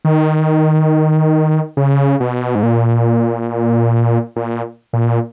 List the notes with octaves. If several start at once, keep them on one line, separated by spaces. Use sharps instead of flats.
D#3
C#3
B2
G#2
A#2
A#2
A#2